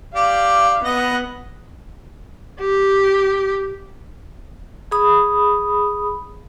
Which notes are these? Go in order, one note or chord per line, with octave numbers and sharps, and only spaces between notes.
G4 D5 F5
B3 D#5 F#5
G4
G#4 B5 D#6